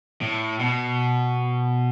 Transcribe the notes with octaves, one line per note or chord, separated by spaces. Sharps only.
A2
B2